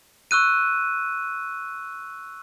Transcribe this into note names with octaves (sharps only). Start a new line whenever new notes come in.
C#6 E6 F#6 D#7